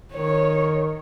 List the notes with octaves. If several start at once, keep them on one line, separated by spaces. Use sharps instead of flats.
D#3 C#5